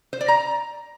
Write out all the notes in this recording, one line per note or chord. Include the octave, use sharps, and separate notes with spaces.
C5
D5
A#5